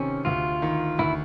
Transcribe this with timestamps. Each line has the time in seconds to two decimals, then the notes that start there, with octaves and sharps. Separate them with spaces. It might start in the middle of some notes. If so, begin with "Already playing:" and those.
Already playing: C3 D#3 C#4
0.25 D2 F4
0.62 D#3
0.99 D2 E4